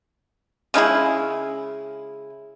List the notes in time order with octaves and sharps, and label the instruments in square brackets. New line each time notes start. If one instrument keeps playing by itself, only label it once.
[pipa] C#3 G#3 E4 G#4